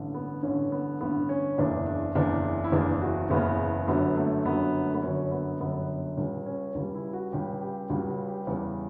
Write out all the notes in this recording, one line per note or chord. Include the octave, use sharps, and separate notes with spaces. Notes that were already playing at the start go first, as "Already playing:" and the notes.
Already playing: A1 G2 D3
B3
A1 G2 D3 C#4
B3
A1 G2 D3 B3
C#4
F#1 E2 C#3 D4
D4
F#1 E2 C#3 D4
E4
F#1 E2 C#3 D4
F#4
F#1 E2 C#3 B3
G1 F#2 D3 F#3 B3
A3
G1 F#2 D3 F#3 B3
A3
B3
G1 F#2 D3 F#3 C#4
B3
G1 F#2 D3 F#3 B3
C#2 C#3 G3 C#4
C#4
C#2 C#3 G3
E4
F#4
C#2 C#3 G3 G4
G4
C#2 C#3 G3 F#4
F#4
G4
E2 C#3 G3